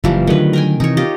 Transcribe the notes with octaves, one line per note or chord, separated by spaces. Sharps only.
F#1 E3 F3 G3
D3 D#3 F#3 A3 B4
A#4 G5 G#5
C3 E3 D#4 C#5
F4 G4 D#5